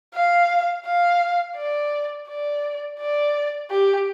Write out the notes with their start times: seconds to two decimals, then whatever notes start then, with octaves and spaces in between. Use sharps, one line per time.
0.14 F5
0.85 F5
1.56 D5
2.28 D5
2.99 D5
3.71 G4